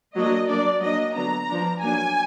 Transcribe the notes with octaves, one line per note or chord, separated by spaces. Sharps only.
F#3 A#3 D4 D#5
F#3 A#3 D4 D5
F#3 A#3 D4 D#5
D3 F#3 B3 D4 A#5
F3 B3 D4
F#3 A#3 D4 G#5